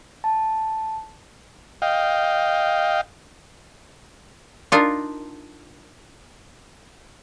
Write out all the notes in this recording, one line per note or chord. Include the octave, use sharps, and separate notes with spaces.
A5
D#5 F5 G5
D4 D#4 F4 A#4